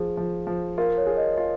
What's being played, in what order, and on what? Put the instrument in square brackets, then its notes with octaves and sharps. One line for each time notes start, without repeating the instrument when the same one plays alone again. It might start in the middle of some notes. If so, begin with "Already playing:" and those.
Already playing: [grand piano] F3 [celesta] G#4
[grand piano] F3
F3
[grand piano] F4 [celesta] A#4
[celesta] C#5
[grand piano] G#4
[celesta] D#5
[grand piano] F4